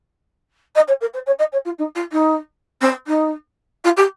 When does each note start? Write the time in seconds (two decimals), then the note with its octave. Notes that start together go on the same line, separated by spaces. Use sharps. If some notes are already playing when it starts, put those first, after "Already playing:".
0.75 D#5
0.88 C#5
1.01 A#4
1.14 C5
1.27 C#5
1.39 D#5
1.53 C#5
1.65 F4
1.79 D#4
1.95 F4
2.12 D#4
2.81 C4
3.07 D#4
3.85 F4
3.97 G4